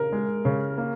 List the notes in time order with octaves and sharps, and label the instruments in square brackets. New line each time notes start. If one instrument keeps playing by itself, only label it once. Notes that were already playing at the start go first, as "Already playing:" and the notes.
Already playing: [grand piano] C#3 [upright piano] A#4
[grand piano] G#3
C#3
A#3